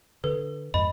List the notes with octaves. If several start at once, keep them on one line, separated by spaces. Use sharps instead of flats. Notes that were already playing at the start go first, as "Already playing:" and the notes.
D3 A4 B4
F2 G#2 D#5 B5